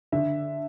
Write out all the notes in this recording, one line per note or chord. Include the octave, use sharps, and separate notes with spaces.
D3 E5